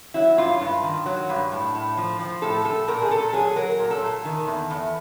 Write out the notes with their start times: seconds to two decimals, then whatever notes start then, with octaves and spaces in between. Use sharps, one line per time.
0.14 F#3 E4
0.37 G2 F4
0.61 G2 F4
0.83 D#3
1.06 F#3
1.29 G2
1.52 A2
1.75 A2
1.97 F3
2.19 F3
2.42 A2 A4
2.64 A2 A4
2.88 A#2 A#4
3.02 G#4
3.10 A#2 A4
3.33 F#3 G#4
3.56 F#3 A#4
3.79 A#2
3.90 A4
4.01 A#2
4.25 D#3
4.47 E2
4.70 E2